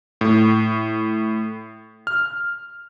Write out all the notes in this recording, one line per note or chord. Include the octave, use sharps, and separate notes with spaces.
A2
F6